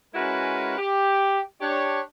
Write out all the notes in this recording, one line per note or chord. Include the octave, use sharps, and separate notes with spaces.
G#3 C#4 E4 F#4 A#4 B4
G4
D4 G4 C#5